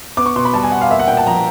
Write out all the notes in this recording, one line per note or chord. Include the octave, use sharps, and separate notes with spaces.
B3 D6
C#6
B2 C6
B5
G3 A5
G#5
B2 F#5
F5
A#3 E5
F#5
A#2 G5
A5
F3 A#5